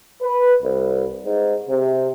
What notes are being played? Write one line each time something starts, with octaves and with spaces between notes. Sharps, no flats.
B4
C2
G#2
C3